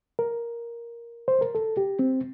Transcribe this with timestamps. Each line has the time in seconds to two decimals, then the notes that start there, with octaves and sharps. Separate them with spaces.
0.19 A#4
1.28 C5
1.41 A#4
1.55 A4
1.77 G4
1.99 C4